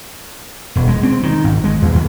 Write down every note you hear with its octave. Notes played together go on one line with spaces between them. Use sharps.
E1
G#3
C4
D#3
G#1
G#3
E2
D#2